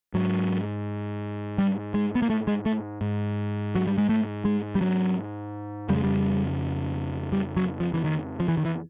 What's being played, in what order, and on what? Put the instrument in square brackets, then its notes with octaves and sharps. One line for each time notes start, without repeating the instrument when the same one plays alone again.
[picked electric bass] G#2 F#3
G3
G#3
B3
A#3
A3
G#3
A3
G#2
F#3
G3
G#3
A3
G#3
G3
F#3
F2 C#3 G3
G#3
G3
G3
F#3
F3
E3
D#3
F3
E3
D#3
E3